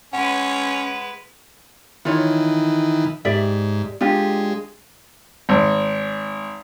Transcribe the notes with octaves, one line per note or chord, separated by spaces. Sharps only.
G#3 C#4 B4 F#5
D#3 E3 F4 C#5
G#2 G4 D5 E5
G#3 D4 F4 G4
G#1